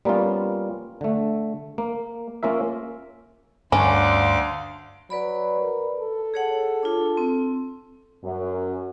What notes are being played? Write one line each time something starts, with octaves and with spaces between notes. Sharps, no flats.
G3 A#3 B3 C#4 F4
D3 A3
A#3
A#3 C#4 F4 A#4 E5
D2 G2 C#4 D4 F5 F#5 C6 D6
F#3 B4 D5 B5
A#4
A4
G#4 C#5 F#5
D4 F4
C4
F#2